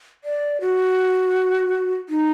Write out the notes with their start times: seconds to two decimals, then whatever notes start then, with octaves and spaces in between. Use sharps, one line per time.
0.24 D5
0.61 F#4
2.09 D#4